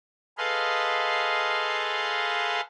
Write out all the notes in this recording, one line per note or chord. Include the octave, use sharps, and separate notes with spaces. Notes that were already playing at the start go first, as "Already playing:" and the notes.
G#4 A4 B4 D#5 F5 C6